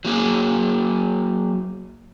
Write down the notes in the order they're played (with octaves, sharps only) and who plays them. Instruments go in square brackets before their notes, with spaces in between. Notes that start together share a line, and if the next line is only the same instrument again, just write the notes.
[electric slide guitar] F#3 A#3 G#4